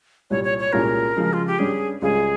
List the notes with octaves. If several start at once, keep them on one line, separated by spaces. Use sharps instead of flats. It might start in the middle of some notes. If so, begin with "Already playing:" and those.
C2 A#2 G3 C#5
C#5
C#5
C2 A#2 G#3 C#4 F4 A#4
C#3 F3 G#3
F4
G4
G2 G3 C#4 G#4
C#2 C#3 G3 C#4 F4 G#4